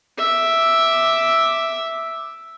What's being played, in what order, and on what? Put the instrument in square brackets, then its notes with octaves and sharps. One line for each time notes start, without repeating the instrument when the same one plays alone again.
[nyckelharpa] E5 D6